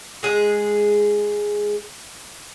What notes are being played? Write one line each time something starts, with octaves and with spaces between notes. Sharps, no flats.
G#3 G#4